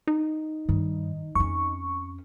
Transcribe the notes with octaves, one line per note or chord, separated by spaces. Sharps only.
D#4
G2 D#3
F2 C#4 C#6